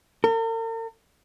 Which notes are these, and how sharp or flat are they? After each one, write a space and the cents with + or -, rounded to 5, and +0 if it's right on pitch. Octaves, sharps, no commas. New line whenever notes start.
A#4 -45